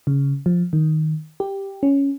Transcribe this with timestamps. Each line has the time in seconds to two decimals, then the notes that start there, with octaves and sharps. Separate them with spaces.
0.07 C#3
0.46 F3
0.73 D#3
1.40 G4
1.83 C#4